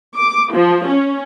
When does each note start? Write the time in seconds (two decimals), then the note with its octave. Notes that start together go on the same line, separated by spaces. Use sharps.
0.17 D6
0.54 F3
0.88 C#4